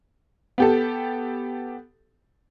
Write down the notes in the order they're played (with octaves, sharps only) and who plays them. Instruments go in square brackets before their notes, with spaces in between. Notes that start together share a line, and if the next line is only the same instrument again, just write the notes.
[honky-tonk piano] B3 G4 A4